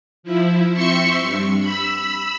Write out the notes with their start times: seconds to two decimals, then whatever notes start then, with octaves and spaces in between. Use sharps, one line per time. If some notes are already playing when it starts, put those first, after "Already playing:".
0.23 F3 E4
0.74 C4 E5 C6 C#6 C#7
1.20 G2
1.60 B5 E6